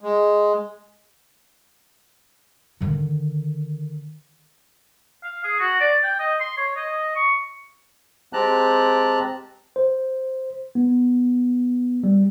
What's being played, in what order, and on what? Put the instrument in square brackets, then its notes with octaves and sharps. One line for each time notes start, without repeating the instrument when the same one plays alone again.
[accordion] G#3
[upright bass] D3 D#3
[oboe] F5
G#4
F#4
D5
G5
D#5
C6
C#5
D#5
C#6
[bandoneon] G#3 C4 G4 A5 A#5 F#6
[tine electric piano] C5
B3
G3